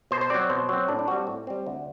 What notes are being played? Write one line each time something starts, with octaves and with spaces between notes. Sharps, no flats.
B2 C5
C5
F#3 C4 D5
B2 C5
F#3 C4
A2 D4
D4
G3 C4 F#4
A2
G3 C4
D2